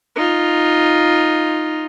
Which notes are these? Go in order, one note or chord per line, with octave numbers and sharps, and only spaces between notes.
D#4 F4